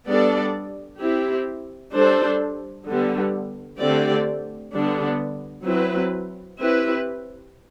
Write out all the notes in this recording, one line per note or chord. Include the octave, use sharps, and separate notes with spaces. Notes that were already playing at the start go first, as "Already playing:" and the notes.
G3 B3 D4 A4 D5
C4 E4 G4
G3 D4 A4 C5
D3 G3 B3
D3 A3 C4 G4 D5
D3 G3 B3 D4
F#3 C4 E4 B4
C4 E4 G4 B4